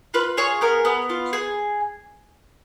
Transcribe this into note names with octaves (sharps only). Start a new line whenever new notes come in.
F4 B4
G#4 C#5
B3 A#4
B3
F4
G#4